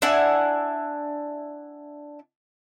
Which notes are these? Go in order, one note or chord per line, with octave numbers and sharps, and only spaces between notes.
D4 E4 F#5 G#5